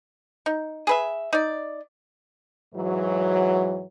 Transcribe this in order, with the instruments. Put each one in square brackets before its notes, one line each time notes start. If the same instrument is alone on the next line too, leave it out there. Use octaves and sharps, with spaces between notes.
[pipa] D#4
G#4 B4 E5
D#4 D5
[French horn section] G#2 E3 F#3